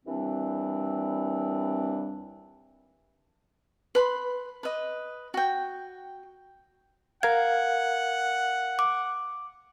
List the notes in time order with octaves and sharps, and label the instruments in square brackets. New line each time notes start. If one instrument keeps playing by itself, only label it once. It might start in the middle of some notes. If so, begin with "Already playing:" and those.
[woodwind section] D#2 E3 G3 C4 D4
[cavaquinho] B4 B5 C6
B4 D#5
F#4 G5
[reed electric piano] A#4 F5 [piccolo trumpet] F#5 [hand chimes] G#6
[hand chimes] D6